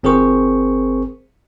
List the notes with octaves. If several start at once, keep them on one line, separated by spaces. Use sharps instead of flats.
G1 C4 G#4 A#4 C5 C#6